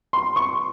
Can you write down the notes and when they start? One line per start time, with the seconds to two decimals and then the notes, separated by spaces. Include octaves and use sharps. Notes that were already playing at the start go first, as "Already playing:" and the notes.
0.13 C6
0.36 C#6